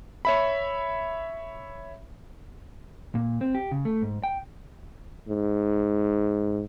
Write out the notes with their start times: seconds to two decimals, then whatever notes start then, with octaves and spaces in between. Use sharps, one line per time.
0.25 C#5 E5 B5
3.15 A#2
3.41 C4
3.55 G4
3.71 C#3
3.85 A3
4.02 G#2
4.24 G5
5.28 G#2